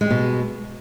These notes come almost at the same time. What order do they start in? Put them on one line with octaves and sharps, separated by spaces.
G#3 G3 B2